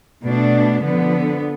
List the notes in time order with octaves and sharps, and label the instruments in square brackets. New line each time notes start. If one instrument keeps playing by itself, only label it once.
[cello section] B2 A3 D4
D3 F3 B3